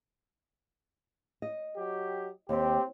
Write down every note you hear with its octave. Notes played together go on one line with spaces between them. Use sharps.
D#5
F#3 G4
D#2 C4 G4